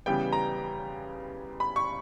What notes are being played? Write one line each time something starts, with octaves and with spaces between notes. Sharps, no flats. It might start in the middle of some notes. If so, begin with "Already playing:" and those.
C#3 E3 G3 B3 G5
A#5
B5
C#6